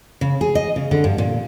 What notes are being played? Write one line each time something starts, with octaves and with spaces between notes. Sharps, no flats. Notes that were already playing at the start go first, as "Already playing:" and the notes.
C#3
G#4
D#5
C#3
D3
G2
A#2